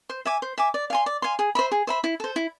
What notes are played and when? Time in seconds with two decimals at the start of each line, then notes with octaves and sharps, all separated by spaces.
0.10 C5
0.25 E5 G#5 D6
0.42 C5
0.58 E5 G#5 D6
0.74 D5
0.90 F5 G#5 C6
1.06 D5
1.22 F5 G#5 C6
1.39 G#4
1.55 C5 E5 B5
1.72 G#4
1.87 C5 E5 B5
2.04 E4
2.20 A4 C5
2.36 E4